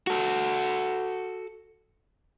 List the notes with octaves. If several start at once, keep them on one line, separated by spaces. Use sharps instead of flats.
F#4 A4